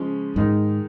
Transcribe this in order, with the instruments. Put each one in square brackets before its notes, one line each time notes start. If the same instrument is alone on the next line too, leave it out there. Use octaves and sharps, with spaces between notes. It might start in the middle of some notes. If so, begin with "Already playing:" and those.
Already playing: [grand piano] C#3 F3 G#3 C#4
[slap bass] G#2 [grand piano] D#3 G#3 D#4